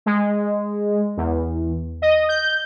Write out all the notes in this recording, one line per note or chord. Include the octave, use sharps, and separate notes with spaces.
G#3
E2
D#5
G6